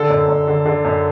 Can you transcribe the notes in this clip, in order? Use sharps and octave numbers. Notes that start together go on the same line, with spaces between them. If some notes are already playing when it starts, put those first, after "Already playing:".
Already playing: D3 A4
F#2
F#2
D3
D3
F#2